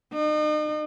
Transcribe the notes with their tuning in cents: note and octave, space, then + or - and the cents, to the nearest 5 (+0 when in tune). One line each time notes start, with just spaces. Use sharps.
D#4 -40